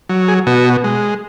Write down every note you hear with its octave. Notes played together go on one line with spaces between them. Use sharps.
F#3
G#4
B2 F#4
G#3